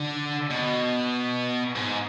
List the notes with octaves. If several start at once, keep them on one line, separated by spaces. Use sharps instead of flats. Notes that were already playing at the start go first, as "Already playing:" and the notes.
Already playing: D3
B2
G#2